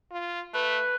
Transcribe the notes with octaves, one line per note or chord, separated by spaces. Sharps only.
F4
A3 B4